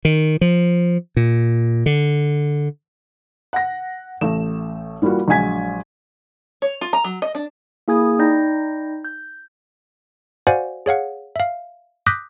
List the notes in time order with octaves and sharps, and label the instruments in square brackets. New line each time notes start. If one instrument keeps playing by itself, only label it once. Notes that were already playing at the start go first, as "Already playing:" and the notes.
[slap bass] D#3
F3
A#2
D3
[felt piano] F#5 A#6
A1 A3 E7
E3 G3 A#3 F4 F#4
A#1 F#3 G#3 G#5 G#6 B6
[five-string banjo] C#5
F4
A#5
F#3
D#5
D4
[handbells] A#3 E4 G#4 G#5 D#6 G#6
D#4 D5 G5 B5 G6 A#6
G6
F#4 C5 D5 F5 F#5 G#5
G#4 C#5 F5 F#5
E5 F5
D6 D#6 F#6 G6 A#6 B6